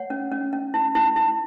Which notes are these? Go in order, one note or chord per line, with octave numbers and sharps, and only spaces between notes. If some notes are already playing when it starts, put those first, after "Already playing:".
Already playing: C#5 F#5
C#4
C#4
C#4
E4
E4
E4